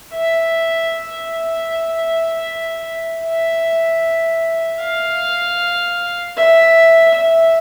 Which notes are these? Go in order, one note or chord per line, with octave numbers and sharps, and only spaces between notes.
E5
E5
F5
E5
E5